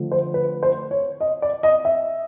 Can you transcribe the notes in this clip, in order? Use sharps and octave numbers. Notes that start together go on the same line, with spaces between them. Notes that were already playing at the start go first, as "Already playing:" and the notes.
Already playing: D3 F3 A3
C5
B4
C5
C#5
D#5
D5
D#5
E5